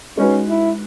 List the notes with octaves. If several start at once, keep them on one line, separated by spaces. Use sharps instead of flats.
G#3 C#4 D#4 F#4 B4
E4